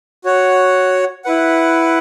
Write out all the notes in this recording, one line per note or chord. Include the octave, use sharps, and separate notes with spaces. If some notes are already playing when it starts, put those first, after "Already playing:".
F#4 C#5 F#5
E4 B4 F#5